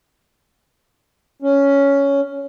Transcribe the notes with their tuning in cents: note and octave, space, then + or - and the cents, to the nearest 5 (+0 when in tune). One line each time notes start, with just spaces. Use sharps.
C#4 +10